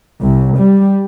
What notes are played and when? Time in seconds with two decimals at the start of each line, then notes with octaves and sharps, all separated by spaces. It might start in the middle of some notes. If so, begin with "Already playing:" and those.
0.23 C2
0.59 G3